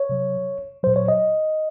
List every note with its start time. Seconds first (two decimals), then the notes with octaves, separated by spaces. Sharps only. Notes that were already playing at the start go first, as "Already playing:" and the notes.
Already playing: C#5
0.09 C3 F#3
0.83 A#2 F#3 C5
0.96 C#5
1.08 D#5